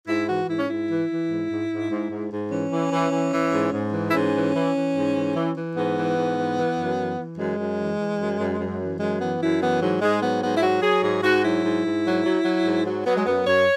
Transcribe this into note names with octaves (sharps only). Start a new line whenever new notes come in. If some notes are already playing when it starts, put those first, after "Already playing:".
G#2 E4
E3 F#4
G#2 E4
C#4
G#2 E4
E3
E3
G#2
G#2
G#2
G#2
G#2
G#2
E3 C#4
E3
E3
E3
E3
G#2
G#2
E3
E4
G#2 C#4
E3
E3
E3
G#2
E3
E3
E3
G#2 B3
E3
G#2
E3
E3
F#2
E3
E3
F#2 G#3
F#2
E3
E3
F#2
F#2
F#2
E3
F#2 G#3
E3 B3
F#2 E4
E3 B3
G#2 F#3
G#2 G#3
F#3 B3
G#2 B3
E4
F#3 F#4
F#3 G#4
G#2 G#4
G#2 F#4
F#3 E4
G#2
G#2
F#3
F#3
F#3
G#2
F#3
F#3 B3
G#3
F#2 B3
F#2 C#5